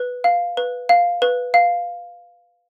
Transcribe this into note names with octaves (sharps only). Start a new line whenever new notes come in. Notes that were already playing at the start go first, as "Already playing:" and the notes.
Already playing: B4
F5
B4
F5
B4
F5